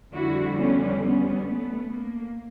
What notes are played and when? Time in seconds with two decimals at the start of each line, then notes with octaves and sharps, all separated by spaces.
0.13 F2 D3 G3 E4 F#4
0.58 B3 C#4
1.02 B3 C#4
1.46 A3 B3
1.91 A#3